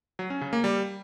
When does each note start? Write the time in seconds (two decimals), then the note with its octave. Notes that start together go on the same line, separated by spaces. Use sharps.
0.19 F#3
0.30 C#4
0.41 C#3
0.53 A#3
0.64 G3